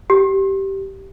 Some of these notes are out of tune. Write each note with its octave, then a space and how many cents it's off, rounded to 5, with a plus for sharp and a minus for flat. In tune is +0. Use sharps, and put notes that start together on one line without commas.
G4 -15